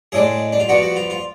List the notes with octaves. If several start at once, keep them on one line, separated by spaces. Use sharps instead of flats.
A2 G#3 D4 G#4
D4
F4
F3 B3 D4 F#4
F#4
F4
F4